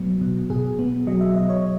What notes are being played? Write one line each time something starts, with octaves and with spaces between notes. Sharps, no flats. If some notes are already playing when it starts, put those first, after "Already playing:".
Already playing: B2 F#3 B3
B2
B2 G#4
B3
F#3 D#5
E5
B2 D#5
C#5